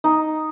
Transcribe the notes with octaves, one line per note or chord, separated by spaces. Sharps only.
D#4